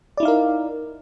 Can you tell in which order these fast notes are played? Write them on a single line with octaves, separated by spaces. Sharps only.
D5 E4 D#4 F5 A#4